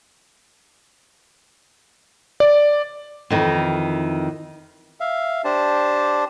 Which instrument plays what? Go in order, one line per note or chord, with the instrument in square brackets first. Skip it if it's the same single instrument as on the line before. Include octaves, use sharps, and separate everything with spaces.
[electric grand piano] D5
[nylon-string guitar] F2 D#3 E3
[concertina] E5 F5
D4 G4 C5 A5